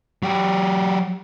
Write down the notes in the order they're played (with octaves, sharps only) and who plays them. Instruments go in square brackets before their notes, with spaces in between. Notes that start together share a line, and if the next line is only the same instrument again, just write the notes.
[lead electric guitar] F#3 G4